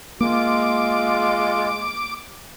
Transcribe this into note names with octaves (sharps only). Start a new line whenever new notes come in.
G#3 A#3 F4 D6